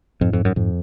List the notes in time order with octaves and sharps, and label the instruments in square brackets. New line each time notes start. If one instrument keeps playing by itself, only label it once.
[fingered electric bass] F2 [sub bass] G#2
[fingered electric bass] F2
F#2
[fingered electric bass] F2 [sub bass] G#2